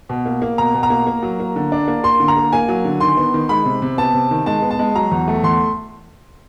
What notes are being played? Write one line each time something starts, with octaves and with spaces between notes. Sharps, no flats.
B2
A#3
A#3
B2 A#5
B2
A#5
A#3
A#3
F#3
A#3
D3
D4
A#3
A#3 C6
D3
A#5
A#3
A#3 G#5
F#3
D3
D#3 C6
B3
D#3
G#3 B5
C3
C3
B3 A5
C3
D#3
G#3 A5
B3
A5
G#3
F#3 A#5
E2
A3
E2 C6